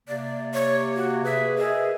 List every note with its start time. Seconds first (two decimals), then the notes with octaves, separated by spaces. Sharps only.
0.08 C3 A#3 D5
0.54 C#5
0.96 F#4
1.25 G#4 B4 E5
1.58 G#4 A#4 D#5 E5